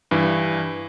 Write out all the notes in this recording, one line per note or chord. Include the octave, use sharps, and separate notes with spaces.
G2 E3